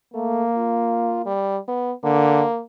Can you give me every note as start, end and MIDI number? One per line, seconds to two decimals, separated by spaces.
0.14 0.43 57
0.14 1.33 58
0.57 1.23 65
1.26 1.58 55
1.68 1.92 59
2.04 2.44 50
2.04 2.61 58